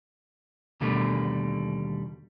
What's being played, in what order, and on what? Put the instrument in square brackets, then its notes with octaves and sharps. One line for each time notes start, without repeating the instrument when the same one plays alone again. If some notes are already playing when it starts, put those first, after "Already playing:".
[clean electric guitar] D#2 B2 D3 G3 A3 A#3